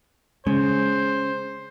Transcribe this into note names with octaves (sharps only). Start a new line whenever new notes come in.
C#3 G#3 C5